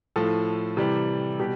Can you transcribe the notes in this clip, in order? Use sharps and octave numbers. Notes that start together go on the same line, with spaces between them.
A2 F3 A4
C3 E3 G3
B2 G3 G4